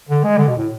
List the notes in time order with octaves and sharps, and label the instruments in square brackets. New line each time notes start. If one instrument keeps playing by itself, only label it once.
[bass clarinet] D3
G#3
D3
B2
A2